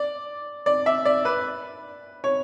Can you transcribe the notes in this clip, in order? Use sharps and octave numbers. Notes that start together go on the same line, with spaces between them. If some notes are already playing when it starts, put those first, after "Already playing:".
Already playing: D5
D5
E5
D5
B4
C#5